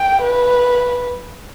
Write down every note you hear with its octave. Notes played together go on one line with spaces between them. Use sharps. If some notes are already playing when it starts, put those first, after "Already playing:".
Already playing: G5
B4